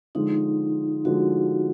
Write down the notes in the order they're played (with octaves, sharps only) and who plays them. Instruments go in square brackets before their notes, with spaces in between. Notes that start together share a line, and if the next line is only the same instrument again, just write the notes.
[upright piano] D3 F3 G#3 [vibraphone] D#4
[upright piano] D3 F3 G#3 [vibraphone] F#4